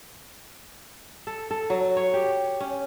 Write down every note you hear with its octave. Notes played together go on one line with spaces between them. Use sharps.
A4
A4
F#3
C#5
G4
C#4